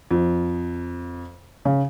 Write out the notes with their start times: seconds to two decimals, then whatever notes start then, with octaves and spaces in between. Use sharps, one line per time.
0.11 F2
1.65 C#3